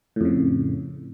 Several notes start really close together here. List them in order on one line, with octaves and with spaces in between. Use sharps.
A2 F2 C#3